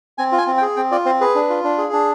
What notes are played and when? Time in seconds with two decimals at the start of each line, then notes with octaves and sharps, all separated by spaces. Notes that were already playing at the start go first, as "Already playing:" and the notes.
0.18 C4 G#5
0.32 F4
0.38 G#5
0.47 C4
0.57 G5
0.62 G#4
0.76 C4 G5
0.91 F4 D5
1.05 C4 C5
1.21 G#4 B4
1.35 D4
1.50 F4
1.64 D4
1.78 G#4
1.93 D4